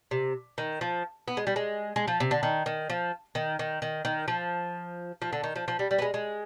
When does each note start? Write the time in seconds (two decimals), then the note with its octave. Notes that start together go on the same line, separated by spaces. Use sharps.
0.11 C3
0.58 D#3
0.81 F3
1.28 B3
1.37 G#3
1.47 G3
1.56 G#3
1.96 G#3
2.08 F3
2.20 C3
2.31 D3
2.43 D#3
2.66 D#3
2.90 F3
3.35 D#3
3.59 D#3
3.82 D#3
4.05 D#3
4.28 F3
5.22 F3
5.33 D3
5.44 D#3
5.56 F3
5.68 F3
5.79 G3
5.91 G3
5.99 B3
6.02 G#3
6.14 G#3